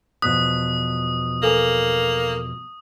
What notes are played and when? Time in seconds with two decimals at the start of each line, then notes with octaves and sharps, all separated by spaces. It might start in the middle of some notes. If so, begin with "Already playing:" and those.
0.22 E2 B2 F3 D#6 F#6 B6
1.43 A#3 A4 B4 G#5